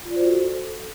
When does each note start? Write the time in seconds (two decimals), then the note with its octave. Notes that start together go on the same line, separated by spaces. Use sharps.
0.05 F4
0.10 D5
0.16 C5
0.21 F#4
0.26 A4